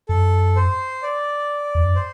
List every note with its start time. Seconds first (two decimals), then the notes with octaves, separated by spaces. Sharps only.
0.09 F#2 A4
0.56 C5
1.03 D5
1.75 E2
1.84 F#2
1.95 C5